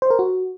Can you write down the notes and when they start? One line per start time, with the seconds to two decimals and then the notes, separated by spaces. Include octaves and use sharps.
0.02 C5
0.11 A#4
0.19 F#4